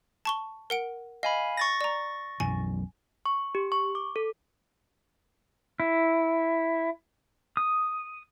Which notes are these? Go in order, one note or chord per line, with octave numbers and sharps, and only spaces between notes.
A5 C#6 G7
A#4 F#5 D7
D#5 F5 G#5 B5
C#6 A6 A#6
D5 A#5
B1 F#2 E3 G#5
C#6
G4
C#6
D6
A4
E4
D#6